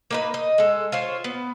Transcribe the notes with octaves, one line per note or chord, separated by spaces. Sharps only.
A#3 D#4 B4
D#5
G#3 A4
F4 C5 C#5
B3